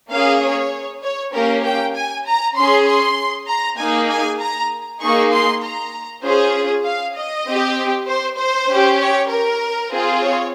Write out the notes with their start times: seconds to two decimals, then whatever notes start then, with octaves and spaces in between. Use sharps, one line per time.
0.11 A#3 C#4 G#4 F5
0.41 C#5
1.02 C#5
1.34 A#3 C#4 G4 A#4
1.64 G5
1.95 G#5
2.26 A#5
2.56 C#4 G#4 C6
2.87 C6
3.48 A#5
3.78 A#3 D#4 G#4 G#5
4.09 G#5
4.40 A#5
5.01 A#3 D#4 G#4 C#6
5.33 C6
5.63 A#5
6.23 C#4 F4 G#4 C5
6.85 F5
7.16 D#5
7.46 C4 G4
8.07 C5
8.38 C5
8.69 C#4 G4
9.00 C#5
9.30 A#4
9.92 C4 F4 G#4
10.22 C#5